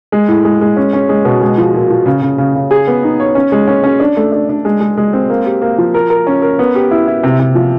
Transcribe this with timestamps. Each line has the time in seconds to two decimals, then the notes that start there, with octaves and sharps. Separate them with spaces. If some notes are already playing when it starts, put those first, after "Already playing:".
0.12 G#3
0.28 A2
0.45 G#3
0.61 G#3
0.77 C#4
0.93 C#4
1.09 G#3
1.25 B2
1.41 G#3
1.58 F3
1.74 A#2
1.90 F3
2.06 C#3
2.22 C#3
2.38 C#3
2.55 C#3
2.71 G#4
2.87 B3
3.03 D#4
3.20 C#5
3.35 C#4
3.52 G#3
3.68 C#4
3.84 C#4
4.00 D4
4.17 A3
4.32 D4
4.49 D4
4.65 G#3
4.81 G#3
4.97 G#3
5.13 C4
5.30 A#3
5.46 G4
5.62 A#3
5.78 F3
5.94 A#4
6.10 A#4
6.27 C#4
6.42 A#4
6.59 B3
6.75 G4
6.91 E4
7.08 E4
7.24 C3
7.40 C3
7.55 F3